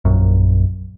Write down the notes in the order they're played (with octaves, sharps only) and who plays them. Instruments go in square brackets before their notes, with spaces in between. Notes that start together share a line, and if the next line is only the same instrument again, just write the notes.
[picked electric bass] A#1 F#2